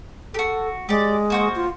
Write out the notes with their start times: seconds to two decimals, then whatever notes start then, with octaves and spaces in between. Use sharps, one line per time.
0.34 F#4 G4 A4
0.89 G#3 G4 D5
1.30 A#3 F#4 C5
1.56 F4